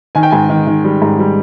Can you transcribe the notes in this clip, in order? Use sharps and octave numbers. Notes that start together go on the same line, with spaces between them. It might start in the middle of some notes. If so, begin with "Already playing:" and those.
D#3 G#5
G5
G#2 G#5
D#3
D#3
G3
G#2
G3